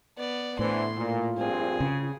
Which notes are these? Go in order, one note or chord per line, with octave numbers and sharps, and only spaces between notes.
B3 D5
A2 D3 E3 C5 C6
A#2 F4
A#1 G2 C4 G#4
C#3